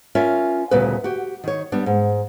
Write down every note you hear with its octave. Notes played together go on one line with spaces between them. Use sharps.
C#4 F4 A#4 C#5 E5
D2 A#2 C#3 G3 B3 B4
F#4 G4
D#3 C#5
G3 B3 D4
G#2